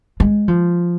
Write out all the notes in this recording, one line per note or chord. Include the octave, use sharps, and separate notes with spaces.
G#3
F3